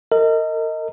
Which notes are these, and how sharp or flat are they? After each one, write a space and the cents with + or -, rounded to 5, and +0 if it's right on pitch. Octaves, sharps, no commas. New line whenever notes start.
A#4 -35 D#5 +15